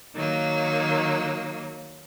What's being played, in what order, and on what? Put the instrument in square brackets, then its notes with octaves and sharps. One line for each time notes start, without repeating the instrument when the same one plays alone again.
[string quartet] D#3 F#3 A#3